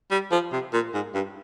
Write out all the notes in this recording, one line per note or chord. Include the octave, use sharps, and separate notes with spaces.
G3
F3
C3
A#2
G#2
G2